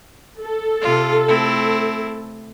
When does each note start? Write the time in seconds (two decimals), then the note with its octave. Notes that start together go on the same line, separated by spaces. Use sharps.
0.43 A4
0.82 C3 F4
1.28 A3 C4 E4